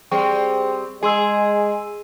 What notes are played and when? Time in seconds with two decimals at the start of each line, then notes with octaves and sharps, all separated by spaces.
0.11 G3 C4 G#4 G5 C#6
1.03 G#3 G#4 G#5 C6 E6